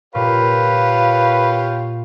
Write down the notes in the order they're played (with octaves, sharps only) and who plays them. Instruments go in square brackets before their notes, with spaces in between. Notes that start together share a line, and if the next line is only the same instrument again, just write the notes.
[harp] A#2 [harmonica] F4 G4 C#5 [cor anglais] B4 [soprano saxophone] F5